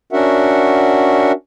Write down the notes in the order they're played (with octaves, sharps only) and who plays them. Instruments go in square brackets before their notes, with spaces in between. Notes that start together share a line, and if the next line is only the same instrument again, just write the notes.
[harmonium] C#4 D4 F#4 A#4 E5 F#5